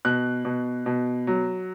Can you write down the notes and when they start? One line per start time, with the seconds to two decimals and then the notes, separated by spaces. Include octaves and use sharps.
0.05 B2 F#6
0.45 B2
0.86 B2
1.27 F#3